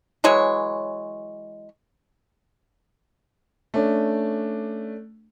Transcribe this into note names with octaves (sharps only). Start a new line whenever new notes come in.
E3 F#3 G#3 C#5
A3 C#4 D4